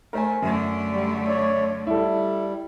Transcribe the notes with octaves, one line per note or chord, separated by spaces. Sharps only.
A3 A#4 C5 G#5
F#2 D3 A3
G3
C#5 D5
G3 E4 A4